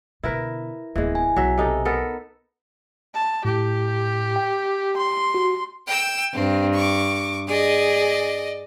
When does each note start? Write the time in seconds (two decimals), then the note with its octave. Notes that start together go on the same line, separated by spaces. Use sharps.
0.23 B2 D3 E4 A#4 B4
0.95 D1 E3 G#3 B3
1.15 G#5
1.36 B1 F#3 E5
1.58 C3 D#4 A4
1.85 B3 A4 A#4
3.14 A5
3.45 A2 G4
4.36 G5
4.97 C6
5.35 F#4
5.87 G5 E6
6.34 G2 C4
6.74 C#6 D6
7.48 G#4 D5 D#5